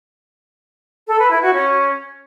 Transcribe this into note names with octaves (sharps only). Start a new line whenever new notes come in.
A4
B4
E4
F#4
C#4